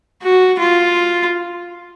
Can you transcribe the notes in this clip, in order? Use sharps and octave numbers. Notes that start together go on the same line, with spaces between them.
F#4
F4